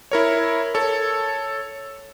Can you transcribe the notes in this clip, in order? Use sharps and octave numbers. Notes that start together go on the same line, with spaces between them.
E4 A#4 C#5
A4 C#5